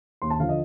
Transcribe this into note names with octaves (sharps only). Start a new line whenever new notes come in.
D#2 C6
A5
D3 F3 F5
D#5